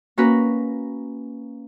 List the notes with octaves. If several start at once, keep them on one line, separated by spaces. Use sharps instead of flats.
A#3 C#4 F#4 A#4 B4